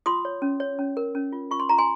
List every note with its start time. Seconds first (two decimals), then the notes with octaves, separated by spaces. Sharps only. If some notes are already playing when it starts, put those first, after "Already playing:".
0.06 F4 C6 D#6
0.25 C#5
0.42 C#4
0.60 C#5
0.79 C#4
0.97 A#4
1.15 C#4
1.32 F4
1.51 F4 C#6
1.60 C6
1.69 F4 A#5
1.78 G#5 C6